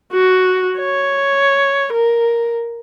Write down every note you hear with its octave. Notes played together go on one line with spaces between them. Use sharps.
F#4
C#5
A#4